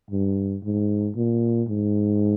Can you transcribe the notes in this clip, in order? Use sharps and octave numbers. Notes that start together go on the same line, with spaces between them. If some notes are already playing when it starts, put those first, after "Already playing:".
G2
G#2
A#2
G#2